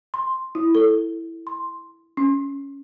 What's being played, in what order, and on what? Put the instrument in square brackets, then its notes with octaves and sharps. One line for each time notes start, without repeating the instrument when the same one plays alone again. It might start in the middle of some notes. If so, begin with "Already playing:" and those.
[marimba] C6
E4
A4
C6
C#4